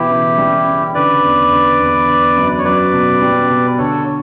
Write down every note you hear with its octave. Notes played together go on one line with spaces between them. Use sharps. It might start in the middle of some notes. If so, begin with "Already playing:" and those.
Already playing: B2 E3 E4 G4
C#3
G3
C#3
D3 B4 D5
E2
D3
E2
D3
F#2
C#5
F#3 B4 D5
B2
G3
B2
D3 A4 C#5